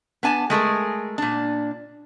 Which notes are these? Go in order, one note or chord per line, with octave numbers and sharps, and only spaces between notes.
B3 D4 G#5 A5
G#3 A3 G#4 A#4
A#2 D4